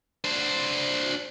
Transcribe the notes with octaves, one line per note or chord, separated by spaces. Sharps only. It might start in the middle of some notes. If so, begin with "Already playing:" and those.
D4 C5